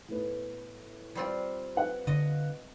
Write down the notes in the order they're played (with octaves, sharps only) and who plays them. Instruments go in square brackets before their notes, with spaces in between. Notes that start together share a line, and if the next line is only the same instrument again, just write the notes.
[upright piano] A2 B3
[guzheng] G3 C4 F4
[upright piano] B4 F5 F#5
[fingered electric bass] D3 [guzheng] D#5